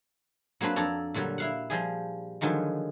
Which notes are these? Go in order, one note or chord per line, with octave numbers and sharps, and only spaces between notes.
F#3 A#3 C4 D4 B4
F2 D4 A4 C#5 A#5
A#2 D3 F#3 G3
E4 F5 F#5
F3 G3 G#4
D3 D#3 F3 F#3 G#3